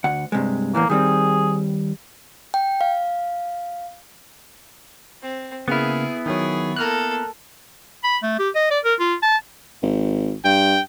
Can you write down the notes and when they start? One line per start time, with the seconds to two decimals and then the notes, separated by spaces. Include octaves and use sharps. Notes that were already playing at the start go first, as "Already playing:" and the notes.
0.04 D2 F#5
0.32 G2 C3 G#3
0.74 E2 A2 E3 A#3
0.90 D#3 G3 C4 G#4
2.54 G5
2.81 F5
5.22 C4
5.68 C#3 A#3 B3 E4 G#4 F6
6.26 D#3 F#3 G#4 C#5
6.76 A#3 A4 A#5 F6 F#6
8.04 B5
8.23 A3
8.39 G4
8.55 D#5
8.71 D5
8.85 A#4
8.99 F4
9.23 A5
9.82 G#1
10.44 G2 G5